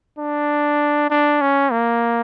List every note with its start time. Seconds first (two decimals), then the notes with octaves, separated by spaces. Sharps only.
0.18 D4
1.10 D4
1.41 C#4
1.72 A#3